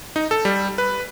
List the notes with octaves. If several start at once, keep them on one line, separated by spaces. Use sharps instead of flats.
D#4
A4
G3
B4